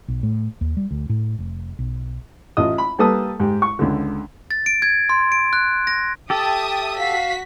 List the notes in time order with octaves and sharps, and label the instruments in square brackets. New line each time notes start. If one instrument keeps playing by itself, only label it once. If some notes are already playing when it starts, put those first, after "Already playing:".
[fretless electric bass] B1
A2
D#2
G3
D2
A2
F1
B1
[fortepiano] A1 F4 D#5 D#6
B5
G3 A#3 A4 B4 A5 D#6
G#2 G4
C#6
C#2 D3
[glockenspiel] A6
D7
G#6
C6
D7
F#6
A#6
[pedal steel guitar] G4 A4 [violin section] E5 A5 D#6 [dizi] G5
[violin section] F#4 B6 [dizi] F5